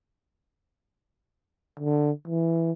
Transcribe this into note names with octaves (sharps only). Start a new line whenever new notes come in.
D3
E3